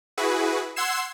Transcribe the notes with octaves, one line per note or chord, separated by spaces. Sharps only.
E4 F#4 G#4 B4
F#5 C6 E6 G#6 C7 E7